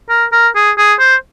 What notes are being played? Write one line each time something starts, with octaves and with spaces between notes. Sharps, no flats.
A#4
A#4
G#4
G#4
C5